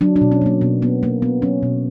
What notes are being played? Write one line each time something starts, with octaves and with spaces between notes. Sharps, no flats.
F#3 D4
D4
B2
C#4
F#3 A#3
B2 B3
A#3 B3
A#3
B2 B3
F#3 C#4
B2